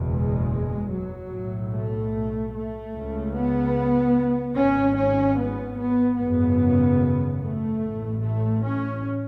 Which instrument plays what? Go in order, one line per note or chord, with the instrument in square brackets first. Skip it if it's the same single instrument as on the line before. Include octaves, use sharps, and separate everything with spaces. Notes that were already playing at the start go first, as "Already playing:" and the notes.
Already playing: [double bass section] F#1 E2 B2
G#3
F#3
B1 A2
A3
A3
C#2 C#3
B3
G#1 G#2 C#4
C#4
B3
B3
G#1 F#2 C#3 B3
A3
A1 A2
A3
C#4